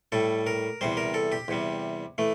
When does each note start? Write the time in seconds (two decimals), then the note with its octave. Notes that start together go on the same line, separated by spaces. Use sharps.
0.12 A2 G3 A4
0.47 A#4
0.81 E2 C3 G3 C5
0.97 A#4
1.14 A4
1.32 G4
1.48 E2 C3 G3
2.18 E3 A3